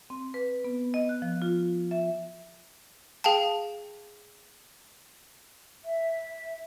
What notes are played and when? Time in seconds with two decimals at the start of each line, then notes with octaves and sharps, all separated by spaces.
0.10 C4
0.34 B4
0.64 B3
0.94 D#5
1.09 F#6
1.22 F3
1.42 F4
1.91 E5
3.24 G#4 F5 G5 A5
5.84 E5